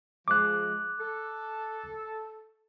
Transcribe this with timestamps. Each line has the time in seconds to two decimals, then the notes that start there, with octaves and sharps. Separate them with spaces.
0.28 F3 G#3 D6 F#6
0.99 A4